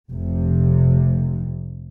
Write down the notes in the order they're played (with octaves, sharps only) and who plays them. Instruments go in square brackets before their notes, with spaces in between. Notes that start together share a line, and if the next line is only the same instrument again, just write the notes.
[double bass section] F1 C3